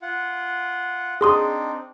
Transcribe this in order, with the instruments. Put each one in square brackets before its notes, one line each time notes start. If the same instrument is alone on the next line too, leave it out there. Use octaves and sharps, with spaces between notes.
[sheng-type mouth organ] F4 F#5
[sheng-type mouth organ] C4 D4 D#4 [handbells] G#4 C6 D#6